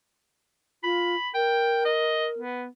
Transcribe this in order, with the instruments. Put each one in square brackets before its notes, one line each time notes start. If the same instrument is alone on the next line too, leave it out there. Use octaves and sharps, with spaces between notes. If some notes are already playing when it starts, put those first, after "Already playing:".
[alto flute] F4 [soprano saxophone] B5
[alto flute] A#4 [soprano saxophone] G5
[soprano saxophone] D#5
B3